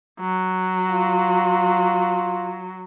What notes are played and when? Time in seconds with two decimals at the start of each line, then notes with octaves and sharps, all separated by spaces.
0.20 F#3
0.90 F4